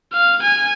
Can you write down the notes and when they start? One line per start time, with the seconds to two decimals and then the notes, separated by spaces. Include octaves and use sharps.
0.13 F5
0.42 G#5